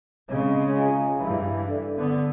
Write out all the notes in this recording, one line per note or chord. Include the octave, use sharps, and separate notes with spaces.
C#3 G#3 C4
F4 G#5 A#5
G2 E3 F5 B5
D4 A4 D5
D3 B3